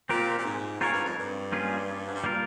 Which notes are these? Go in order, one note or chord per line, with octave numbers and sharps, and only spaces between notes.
A#2 C4 G4 A#4
A#2
G#2
G#2 C4 F4 A#4 C#5
G2
F2
G2
G3 A#3 C#4 F4 G#4
G#2
G2
G3 A#3 F4 A#4